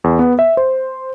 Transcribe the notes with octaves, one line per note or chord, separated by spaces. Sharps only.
E2
B3
E5
C5